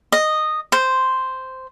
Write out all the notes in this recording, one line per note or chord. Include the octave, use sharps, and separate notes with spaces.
D#5
C5